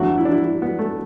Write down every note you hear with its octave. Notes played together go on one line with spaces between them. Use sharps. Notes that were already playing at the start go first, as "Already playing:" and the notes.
Already playing: E2 D3 F#3 A3 F#4
E4
D4
E4
E4
B3
A3